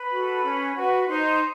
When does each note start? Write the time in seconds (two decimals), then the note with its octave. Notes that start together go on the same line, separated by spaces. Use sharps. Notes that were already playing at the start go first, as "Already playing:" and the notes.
Already playing: B4 B5
0.11 F#4 A4
0.43 C#4
0.75 F#4 B4
1.08 D#4 C5 C6